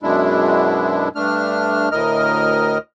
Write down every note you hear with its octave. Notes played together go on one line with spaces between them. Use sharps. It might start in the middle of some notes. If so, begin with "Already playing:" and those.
F#2 B2 G#3 D4 E4
G2 A3 D4 F6
D2 A2 A#4 D#5 F6